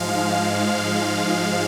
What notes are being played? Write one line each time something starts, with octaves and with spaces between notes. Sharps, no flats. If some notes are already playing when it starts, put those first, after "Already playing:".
Already playing: G#2 F3 G#3 F5